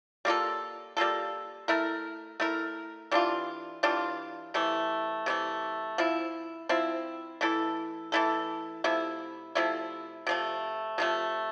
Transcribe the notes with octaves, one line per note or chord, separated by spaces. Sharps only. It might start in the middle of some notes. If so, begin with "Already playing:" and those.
G3 A#3 F4 A4
G3 A#3 F4 A4
A3 E4 A#4
A3 E4 A#4
E3 G3 D4 F4
E3 G3 D4 F4
C3 E3 A3
C3 E3 A3
F3 C4 E4
F3 C4 E4
E3 A3 E4 A4
E3 A3 E4 A4
C3 F3 A3 E4
C3 F3 A3 E4
C3 F3 A3
C3 F3 A3